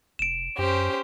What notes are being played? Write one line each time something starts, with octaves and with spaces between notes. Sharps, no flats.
F1 D7 E7
F#2 C#4 G4 C5